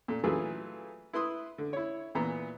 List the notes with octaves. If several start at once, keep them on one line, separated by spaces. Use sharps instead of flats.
A#2 A3
E3 F#3 A3 F4 G#4 B4
E4 B4 C6 D#6
D3
E4 C#5
A#2 E3 B3 A#5